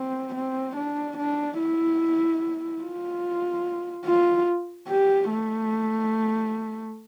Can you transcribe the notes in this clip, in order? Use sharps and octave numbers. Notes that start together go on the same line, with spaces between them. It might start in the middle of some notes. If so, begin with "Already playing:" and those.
Already playing: C4
C4
D4
D4
E4
F4
F4
G4
A3